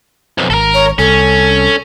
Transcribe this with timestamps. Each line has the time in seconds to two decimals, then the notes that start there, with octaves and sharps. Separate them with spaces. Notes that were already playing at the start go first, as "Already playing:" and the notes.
0.38 B1 F2
0.50 G#1 A4 A#4
0.74 C#5
0.99 C2 C#4 A4